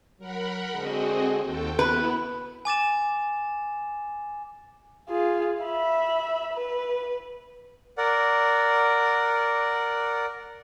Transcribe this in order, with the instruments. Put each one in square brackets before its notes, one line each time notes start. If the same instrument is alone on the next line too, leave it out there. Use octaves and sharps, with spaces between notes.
[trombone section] F#3 [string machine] A#4 F#5 B5
[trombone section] D3 G#3 G#4 [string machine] C4 F#4 D#5
[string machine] D#2 A4 G5 [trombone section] C4 F#4
[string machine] B3 E4 [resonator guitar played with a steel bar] B4
[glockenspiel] G#5 D6 A6 E7
[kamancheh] F4 G#4
E5 B5
B4
[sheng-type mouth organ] A#4 D5 F#5